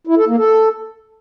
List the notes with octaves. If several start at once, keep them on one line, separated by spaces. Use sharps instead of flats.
E4
A4
A#3
A4